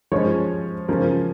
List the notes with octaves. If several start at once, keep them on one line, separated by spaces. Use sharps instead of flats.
F3 G#3 C#4 C#5
C#3 F3 C#4 A#4